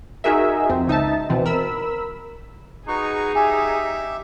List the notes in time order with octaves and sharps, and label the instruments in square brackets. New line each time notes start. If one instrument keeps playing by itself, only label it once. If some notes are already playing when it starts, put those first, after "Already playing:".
[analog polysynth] D#4 F#4 G#4 A#4 E5
F2 C4
C#2 D#4 E5 A5
B2 E3 C4
A#4 B5 E6
[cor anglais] D#4 [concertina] F#4 B4 C#6 [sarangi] G#4
[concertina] G4 E5 [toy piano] G#5